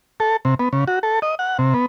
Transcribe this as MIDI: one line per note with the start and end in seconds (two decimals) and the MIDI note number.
0.20 0.37 69
0.45 0.54 48
0.59 0.69 59
0.73 0.84 49
0.88 0.99 66
1.03 1.19 69
1.22 1.35 75
1.39 1.58 78
1.59 1.74 48
1.74 1.86 59